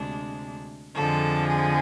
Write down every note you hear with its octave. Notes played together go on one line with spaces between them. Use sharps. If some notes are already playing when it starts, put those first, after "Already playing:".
Already playing: D2 C3 G#3 D4
F2 D3 F3 G#3 A4
G#4